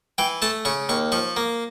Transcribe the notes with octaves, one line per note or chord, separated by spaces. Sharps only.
E3 G5
A3 A5
C#3 C#6
D#2 C#6
F3 C#6
A#3